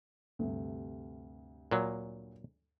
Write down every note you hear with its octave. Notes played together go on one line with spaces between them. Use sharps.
D2 G2 C3
A#2 F#3